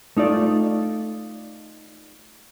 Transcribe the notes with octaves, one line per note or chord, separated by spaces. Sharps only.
A3 D#4 F4 D5